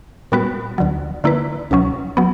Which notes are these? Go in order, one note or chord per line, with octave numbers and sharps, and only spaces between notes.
A#2 G3 B3 F#4 B4
D2 D3 F#3
D3 A#3 E4 B4
C#2 B2 F#3 C#4
F#3 B3